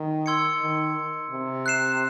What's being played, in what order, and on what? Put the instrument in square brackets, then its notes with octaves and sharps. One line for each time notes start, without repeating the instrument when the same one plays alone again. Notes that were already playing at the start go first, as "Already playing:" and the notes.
Already playing: [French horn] D#3
[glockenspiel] C6 E6 G#6 C#7
[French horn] D#3
C3
[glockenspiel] F#6 C7 E7